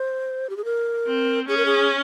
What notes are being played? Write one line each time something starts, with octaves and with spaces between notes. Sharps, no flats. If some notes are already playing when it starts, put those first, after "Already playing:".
Already playing: C5
G4
G#4
A#4
C4
C#4 G#4
A#4
G#4